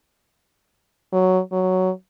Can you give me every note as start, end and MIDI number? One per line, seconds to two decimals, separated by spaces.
1.13 1.39 54
1.52 1.90 54